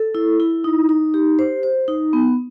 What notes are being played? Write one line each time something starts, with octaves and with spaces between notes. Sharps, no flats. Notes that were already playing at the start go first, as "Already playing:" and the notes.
Already playing: A4
E4
E4
D#4
D#4
G4
C5
C5
D#4
B3